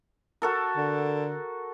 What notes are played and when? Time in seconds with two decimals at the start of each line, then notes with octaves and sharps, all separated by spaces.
0.42 F#4 A4 A#4
0.77 D3